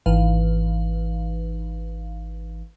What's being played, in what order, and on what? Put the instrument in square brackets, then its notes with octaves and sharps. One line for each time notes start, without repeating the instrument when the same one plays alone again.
[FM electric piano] G#1 E3 B4 F5